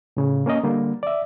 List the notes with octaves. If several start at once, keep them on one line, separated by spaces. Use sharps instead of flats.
A2 C#3
A#3 C#4 A#4 D#5
D3 G3 A#3
D5 E5